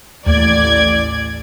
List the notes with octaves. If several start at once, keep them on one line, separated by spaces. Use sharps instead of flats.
A1 D#2 A3 D5 G#6